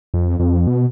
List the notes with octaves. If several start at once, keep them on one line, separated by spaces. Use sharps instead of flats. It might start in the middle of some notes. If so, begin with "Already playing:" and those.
F2
F2
B2